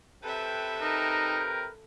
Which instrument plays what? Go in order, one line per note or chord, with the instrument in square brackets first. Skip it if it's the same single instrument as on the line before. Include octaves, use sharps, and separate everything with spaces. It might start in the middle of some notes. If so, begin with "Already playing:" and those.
[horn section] C3 B4 G5 [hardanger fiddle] A4 E5
[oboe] D#4 [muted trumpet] A#4